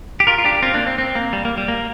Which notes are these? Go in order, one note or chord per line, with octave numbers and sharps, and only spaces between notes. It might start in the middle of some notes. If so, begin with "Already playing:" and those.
G4
F4 A#4
F4
D4 G4
C4 F4
A#3 D4
C4
C4
A#3
G3
A#3
G3
A#3